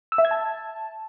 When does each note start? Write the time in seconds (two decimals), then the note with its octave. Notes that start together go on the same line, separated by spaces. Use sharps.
0.12 E6
0.18 E5
0.25 G#6
0.31 A5